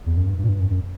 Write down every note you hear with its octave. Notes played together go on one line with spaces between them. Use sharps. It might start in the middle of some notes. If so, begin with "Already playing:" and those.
E2
F#2
G2
G2
A#2
G2
F#2
F#2